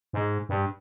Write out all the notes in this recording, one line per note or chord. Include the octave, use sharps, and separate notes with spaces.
G#2
G2